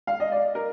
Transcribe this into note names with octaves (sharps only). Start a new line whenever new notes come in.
F5
D#5
D5
A#4